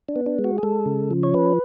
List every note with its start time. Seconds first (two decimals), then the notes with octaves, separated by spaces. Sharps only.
0.09 D4
0.16 B3
0.26 D4
0.39 G#3
0.44 F#4
0.58 G#4
0.63 G#3 A4
0.86 C#3
1.11 F3
1.23 C#5
1.34 C#4 B4